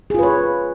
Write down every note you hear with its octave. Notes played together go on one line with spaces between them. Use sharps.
F4 G#4 B4 C#5